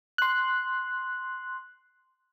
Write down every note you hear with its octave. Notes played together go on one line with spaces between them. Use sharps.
C6 F#6